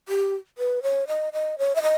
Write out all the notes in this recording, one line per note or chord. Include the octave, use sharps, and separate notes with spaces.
G4
B4
C#5
D#5
D#5
C#5
E5
D#5